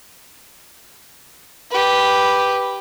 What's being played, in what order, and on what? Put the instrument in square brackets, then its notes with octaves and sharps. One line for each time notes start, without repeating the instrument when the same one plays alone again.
[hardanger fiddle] G4 B4